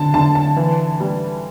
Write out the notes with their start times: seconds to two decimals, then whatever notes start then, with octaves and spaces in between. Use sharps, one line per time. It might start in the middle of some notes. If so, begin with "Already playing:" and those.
Already playing: D3 A5
0.14 D3 A5
0.35 A5
0.57 E3
1.00 G3